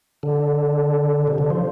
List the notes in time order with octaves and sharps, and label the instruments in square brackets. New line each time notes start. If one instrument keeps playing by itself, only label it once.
[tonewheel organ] D3
C3
D3
F3